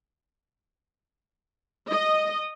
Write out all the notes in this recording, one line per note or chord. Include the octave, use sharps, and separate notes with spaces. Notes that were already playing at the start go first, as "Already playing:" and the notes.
D#5